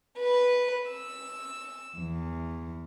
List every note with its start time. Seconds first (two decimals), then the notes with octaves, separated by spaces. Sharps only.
0.18 B4
0.90 E6
1.96 E2